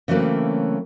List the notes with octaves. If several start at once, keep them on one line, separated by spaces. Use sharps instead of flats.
C#3 E3 F#3 A3 A#3 C4